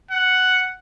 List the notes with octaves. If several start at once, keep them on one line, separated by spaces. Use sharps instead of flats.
F#5